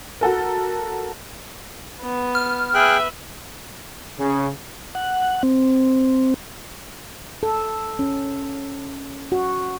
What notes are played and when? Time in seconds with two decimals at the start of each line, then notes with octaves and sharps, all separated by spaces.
0.21 F#4 A4 A#4
2.01 B3
2.35 F6
2.74 G#4 B4 E5 G5 F#6
4.19 C#3
4.95 F#5
5.43 C4
7.43 A4
7.99 C#4
9.32 F#4